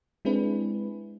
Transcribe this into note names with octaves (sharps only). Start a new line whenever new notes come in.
G#3 C4 D4 E4 G#4 B4